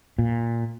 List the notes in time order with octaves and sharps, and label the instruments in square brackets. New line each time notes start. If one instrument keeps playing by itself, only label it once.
[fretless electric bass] A#2